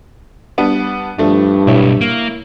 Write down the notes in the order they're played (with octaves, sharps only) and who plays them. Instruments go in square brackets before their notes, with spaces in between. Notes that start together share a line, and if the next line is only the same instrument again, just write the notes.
[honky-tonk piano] G3 B3 D4
[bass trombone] G2 [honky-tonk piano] F3 A3 D4
[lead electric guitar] B1 [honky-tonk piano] E4 C#5
[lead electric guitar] A#3